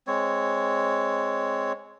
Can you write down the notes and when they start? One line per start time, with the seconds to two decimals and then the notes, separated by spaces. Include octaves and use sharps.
0.07 G#3 C4 C#5